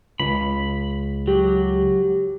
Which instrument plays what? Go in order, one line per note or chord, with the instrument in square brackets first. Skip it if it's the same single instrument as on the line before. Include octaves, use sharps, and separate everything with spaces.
[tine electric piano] C#2 [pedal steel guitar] B5
[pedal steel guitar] F#3 [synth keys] G4